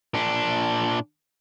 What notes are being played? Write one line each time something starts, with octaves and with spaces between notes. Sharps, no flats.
A#2 D4